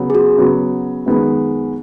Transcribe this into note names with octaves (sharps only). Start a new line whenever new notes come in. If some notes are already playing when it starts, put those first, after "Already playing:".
Already playing: C#3 F#3 B3
G#4
F#4
C#3 F#3 B3
F#2 D#3 G#3 B3